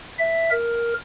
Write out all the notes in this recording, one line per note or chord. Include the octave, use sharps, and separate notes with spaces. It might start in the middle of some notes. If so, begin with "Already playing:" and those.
E5
A#4